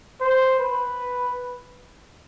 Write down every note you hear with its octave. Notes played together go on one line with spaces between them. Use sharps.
C5
B4